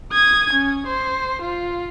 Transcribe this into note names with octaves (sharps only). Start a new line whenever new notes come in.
D#6 G#6
C#4
C5
F4